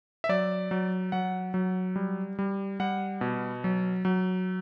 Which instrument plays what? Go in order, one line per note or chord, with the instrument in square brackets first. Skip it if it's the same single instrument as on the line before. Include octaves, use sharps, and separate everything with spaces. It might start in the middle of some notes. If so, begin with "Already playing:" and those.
[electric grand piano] E5
F#3 D5
F#3
F#3 F#5
F#3
G3
G3
G3 F#5
B2
F#3
F#3